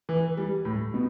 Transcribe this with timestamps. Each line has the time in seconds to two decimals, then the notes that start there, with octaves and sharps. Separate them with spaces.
0.09 E3
0.37 G3
0.65 A2
0.94 B2